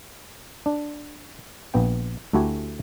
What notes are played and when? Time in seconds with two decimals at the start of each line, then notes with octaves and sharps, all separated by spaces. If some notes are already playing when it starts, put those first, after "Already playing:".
0.66 D4
1.74 A#1 B3 G5
2.33 D2 A3 E4 F#4 G4 G#5